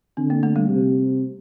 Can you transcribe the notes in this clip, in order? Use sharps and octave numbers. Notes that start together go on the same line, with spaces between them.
D3 C4
A#3
A3
G3
C3